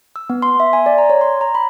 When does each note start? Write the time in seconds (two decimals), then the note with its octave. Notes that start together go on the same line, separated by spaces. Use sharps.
0.16 E6
0.30 B3
0.42 C6
0.60 E5
0.73 G#5
0.86 D5
0.98 A#5
1.10 C#5
1.21 C6
1.41 A#5
1.55 B5